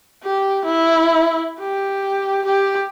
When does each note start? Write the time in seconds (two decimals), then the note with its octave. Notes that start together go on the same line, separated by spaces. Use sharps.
0.24 G4
0.65 E4
1.60 G4
2.45 G4